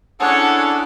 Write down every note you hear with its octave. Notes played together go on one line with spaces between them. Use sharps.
C#4 D4 E4 G#4 A4 C#5 F#5